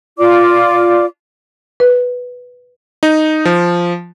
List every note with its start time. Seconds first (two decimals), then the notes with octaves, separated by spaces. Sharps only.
0.18 F4 D5 D6
1.80 B4
3.03 D#4
3.45 F3